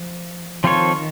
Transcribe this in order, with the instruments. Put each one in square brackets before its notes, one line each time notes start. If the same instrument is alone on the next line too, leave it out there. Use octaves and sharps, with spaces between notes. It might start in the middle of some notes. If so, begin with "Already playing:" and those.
Already playing: [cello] F3
[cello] D#3 [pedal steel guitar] F3 C4 F4 A4 C#5